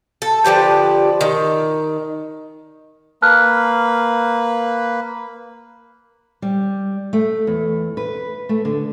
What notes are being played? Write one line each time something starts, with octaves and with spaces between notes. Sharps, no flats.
A4
D3 F3 G4 B4
D#3
A#3 B4 A5 F6 F#6
G3
A3
E2
B4
A3
D3